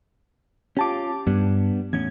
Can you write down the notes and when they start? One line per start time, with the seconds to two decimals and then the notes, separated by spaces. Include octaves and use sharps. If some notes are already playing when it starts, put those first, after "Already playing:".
0.77 C#4 F4 G4 A5 D6
1.27 G2 G3 B3 D4
1.93 E2 A2 C#4 G#6